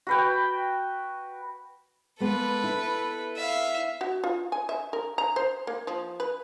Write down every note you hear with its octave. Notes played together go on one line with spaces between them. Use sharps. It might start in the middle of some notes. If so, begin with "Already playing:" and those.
F#4 B4 G5
G#3 A#3 B3 A4 B4
E4
E5 F5
F#4
F4
G#5
E5
A#4
A#5
C5
A#3
F3
B4